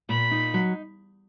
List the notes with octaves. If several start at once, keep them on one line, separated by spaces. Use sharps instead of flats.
A#2 B5
D#4
F#3